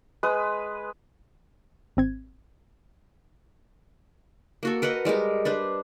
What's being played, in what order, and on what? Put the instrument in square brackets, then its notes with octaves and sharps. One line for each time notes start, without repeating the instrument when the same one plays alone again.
[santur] G#3 B4 D#6
[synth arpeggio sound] G#1 C4 G#6
[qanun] A#3 F#4 A4
A#4 B4 D#5 F#5
G3 G#3 G4 A#4
D4 B4 C5